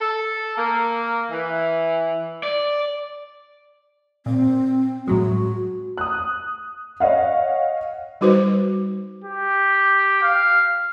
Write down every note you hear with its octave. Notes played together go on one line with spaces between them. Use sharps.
A4
A#3
E3
D5
A#2 C4
A2 F#3 G#3 F#4
D#6 F#6
C#5 D#5 F5 F#5
G3 D#4 F#4 B4 C5
G4
F5